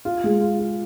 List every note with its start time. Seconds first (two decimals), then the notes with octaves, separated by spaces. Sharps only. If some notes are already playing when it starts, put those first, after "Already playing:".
0.05 F4
0.24 G#3
0.41 F4
0.59 F4